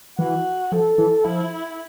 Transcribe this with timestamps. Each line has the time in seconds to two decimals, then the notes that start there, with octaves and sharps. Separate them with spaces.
0.19 E3 F#4
0.72 F3 A4
0.98 E3
1.25 F3 E4